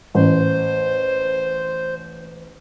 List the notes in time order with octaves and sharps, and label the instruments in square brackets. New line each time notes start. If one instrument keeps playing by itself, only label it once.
[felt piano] A1 [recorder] C5